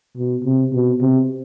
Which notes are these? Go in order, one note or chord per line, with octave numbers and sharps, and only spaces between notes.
B2
C3
B2
C3